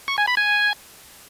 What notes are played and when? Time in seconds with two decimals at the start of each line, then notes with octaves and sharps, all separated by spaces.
0.08 C#6
0.18 G#5
0.27 B5
0.37 G#5